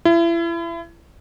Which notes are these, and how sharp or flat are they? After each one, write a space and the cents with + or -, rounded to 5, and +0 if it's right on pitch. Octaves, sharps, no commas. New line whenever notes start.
E4 +35